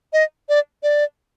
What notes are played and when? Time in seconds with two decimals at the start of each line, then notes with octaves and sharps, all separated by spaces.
0.13 D#5
0.49 D5
0.83 D5